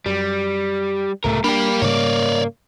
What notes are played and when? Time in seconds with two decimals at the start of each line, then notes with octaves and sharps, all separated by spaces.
0.06 F#2 G3
1.24 C#2 A2 C3 A3 A#4
1.44 G3 A#3 D4 G4
1.82 G#2 C#3 G3 C#5 D5